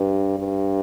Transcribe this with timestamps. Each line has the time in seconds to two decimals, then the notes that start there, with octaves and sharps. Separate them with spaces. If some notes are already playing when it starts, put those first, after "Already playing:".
Already playing: G2
0.39 G2